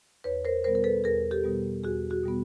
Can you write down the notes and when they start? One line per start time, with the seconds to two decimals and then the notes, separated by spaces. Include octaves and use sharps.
0.24 E2 B4 C#5
0.45 A#4 C5
0.64 B2 G3 B3 A#4 C5
0.75 A#4
0.84 A4 B4
1.04 E2 G#4 A#4
1.31 G4 A4
1.44 B2 G3 B3
1.83 E2 F#4 G#4
2.10 F#4 G#4
2.24 B2 G3 B3